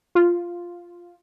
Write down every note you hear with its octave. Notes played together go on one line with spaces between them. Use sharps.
F4